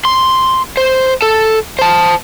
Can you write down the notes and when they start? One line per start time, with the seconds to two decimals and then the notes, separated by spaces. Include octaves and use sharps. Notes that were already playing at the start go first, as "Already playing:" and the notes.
0.05 C6
0.77 C5
1.22 A4
1.79 C5 A5